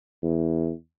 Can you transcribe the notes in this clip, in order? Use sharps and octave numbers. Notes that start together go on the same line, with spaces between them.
E2